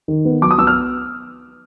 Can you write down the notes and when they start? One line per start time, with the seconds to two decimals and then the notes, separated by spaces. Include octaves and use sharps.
0.08 D#3
0.25 B3
0.42 F#3 D6
0.51 D#6
0.58 B3 E6
0.67 F6